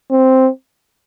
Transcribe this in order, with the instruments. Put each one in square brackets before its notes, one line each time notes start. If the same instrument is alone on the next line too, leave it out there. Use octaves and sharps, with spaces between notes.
[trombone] C4